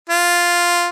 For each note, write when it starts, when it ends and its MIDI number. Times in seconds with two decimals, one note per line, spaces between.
0.09 0.87 65